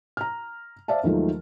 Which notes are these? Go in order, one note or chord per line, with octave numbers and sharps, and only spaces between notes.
A#5 F6
C5 D5 E5 F5 A5
D#2 D#3 F3 F#3 G#3 A3